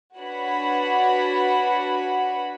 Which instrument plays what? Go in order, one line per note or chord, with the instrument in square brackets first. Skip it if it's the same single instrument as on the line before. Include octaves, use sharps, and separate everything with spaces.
[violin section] D4 F#4 B4 C#5 F#5 B5